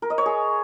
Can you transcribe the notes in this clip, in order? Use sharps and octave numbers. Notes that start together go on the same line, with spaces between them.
A#4
D#5
C#5
G#4